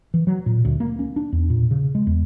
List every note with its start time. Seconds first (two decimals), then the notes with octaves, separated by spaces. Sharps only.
0.14 E3
0.27 F#3
0.46 A#2
0.65 D2
0.80 A#3
0.99 C#4
1.16 D4
1.32 E2
1.50 A#2
1.71 C#3
1.95 G#3
2.07 E2